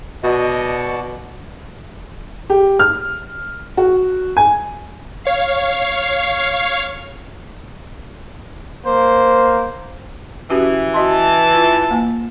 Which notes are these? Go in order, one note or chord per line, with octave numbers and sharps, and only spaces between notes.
B2 F#4 D5 D#5 A5 C#6
G4
F6
F#4
G#5
C#5 F5 C7
A#3 C5
E3 C#4 F#4 G4
F#4 D#5 A5 C6
F4
A#3 G#5